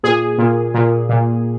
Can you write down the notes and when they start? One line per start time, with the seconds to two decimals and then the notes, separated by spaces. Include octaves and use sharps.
0.03 A#2 G#4
0.38 A#2
0.74 A#2
1.09 A#2